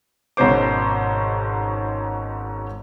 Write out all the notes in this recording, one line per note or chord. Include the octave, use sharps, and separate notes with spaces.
G#1 G#2 B2 C#4 C5 D6